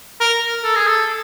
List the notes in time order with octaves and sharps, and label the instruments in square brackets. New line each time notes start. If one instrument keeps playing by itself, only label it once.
[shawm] A#4
A4
G#4
A4